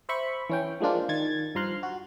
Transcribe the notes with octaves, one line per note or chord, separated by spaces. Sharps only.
C5 E5 B5 C#6
E3 C#4 G5
F3 G#3 A#3 D4 F4
D#3 G#6 A6
G2 F3 A#5 C6 F6 F#6
F#4